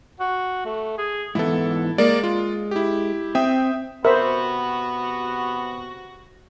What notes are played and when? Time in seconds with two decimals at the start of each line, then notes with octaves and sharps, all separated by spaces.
0.20 F#4
0.65 A3
0.98 G#4
1.35 G#2 E3 B3 E4 A4
1.98 G#3 A#3 A#4 D5
2.23 F4
2.71 E4 G4
3.35 C4 E5 G5 D#6
4.05 C3 B3 F#4 A#4 C5 E5